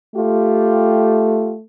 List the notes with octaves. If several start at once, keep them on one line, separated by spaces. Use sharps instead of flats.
A3 F4 G4